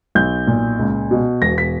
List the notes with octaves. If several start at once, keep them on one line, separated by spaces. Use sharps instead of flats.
B1 G6
A#2
C#2
B2
E1 A#6
B6